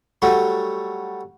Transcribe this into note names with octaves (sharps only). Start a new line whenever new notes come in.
F#3 G3 A3 F#4